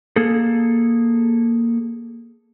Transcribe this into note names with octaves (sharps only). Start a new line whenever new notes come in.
A#3 G#4 A4